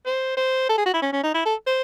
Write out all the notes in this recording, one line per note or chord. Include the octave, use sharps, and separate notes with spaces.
C5
C5
A4
G#4
F#4
E4
C#4
C#4
D#4
E4
A4
C5